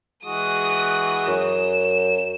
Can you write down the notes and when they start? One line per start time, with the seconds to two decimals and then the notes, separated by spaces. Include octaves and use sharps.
0.25 E3 G#3 F#4 D#6
1.28 F#2 E7